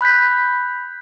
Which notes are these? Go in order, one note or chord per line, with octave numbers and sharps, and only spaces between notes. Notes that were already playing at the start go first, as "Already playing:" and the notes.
B5 F#6 G6 B6